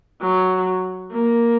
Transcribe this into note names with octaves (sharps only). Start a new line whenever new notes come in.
F#3
A#3